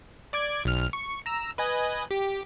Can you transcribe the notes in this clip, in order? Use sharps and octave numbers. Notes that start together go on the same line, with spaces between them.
D5 D6 G#6
B1 F6
C#6
A#5 E6
B4 D#5 G#5
G4